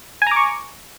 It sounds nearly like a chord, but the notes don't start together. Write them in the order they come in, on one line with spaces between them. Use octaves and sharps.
G#5 A#5 D6 C#6